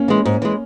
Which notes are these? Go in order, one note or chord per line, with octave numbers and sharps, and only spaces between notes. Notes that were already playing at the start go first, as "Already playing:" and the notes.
Already playing: A#3 C#4
E3 G#3
G#2
E3 G#3